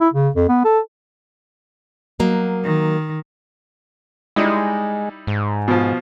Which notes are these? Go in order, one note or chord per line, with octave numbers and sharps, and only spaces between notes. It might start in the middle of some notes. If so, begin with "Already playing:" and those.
E4
C#3
F2
B3
A4
F#3 A#3 D#5
D#3
G3 G#3 D#4 E4
G#2
B2 F3